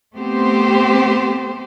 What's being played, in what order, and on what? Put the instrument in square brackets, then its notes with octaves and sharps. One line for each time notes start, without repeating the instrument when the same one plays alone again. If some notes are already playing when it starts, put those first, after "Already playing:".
[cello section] A3 B3 C4 G4 C5